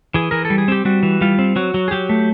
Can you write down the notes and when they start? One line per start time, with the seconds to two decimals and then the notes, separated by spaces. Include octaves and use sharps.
0.14 E3 G#4
0.31 E3 A#4
0.45 A4
0.50 G3
0.58 G#4
0.68 C4 G4
0.85 G3 F#4
1.03 E3
1.21 G3 F4
1.39 C4
1.56 F#3 F#4
1.74 F#3
1.88 G#4
1.91 F#3 G4
2.09 A3